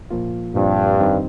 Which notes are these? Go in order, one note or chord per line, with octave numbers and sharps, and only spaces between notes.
A#2 F3 A#3 F4
G2 A#2 F3 C4 G4
F2 D#3 G3 C4 D#4